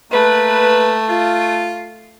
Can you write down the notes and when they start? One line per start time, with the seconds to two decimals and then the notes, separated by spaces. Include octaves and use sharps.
0.12 A3 A#3 B4
1.09 F4